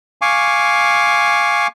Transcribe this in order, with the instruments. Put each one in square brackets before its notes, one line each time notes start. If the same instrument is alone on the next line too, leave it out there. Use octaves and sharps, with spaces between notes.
[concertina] F5 G#5 C#6 D6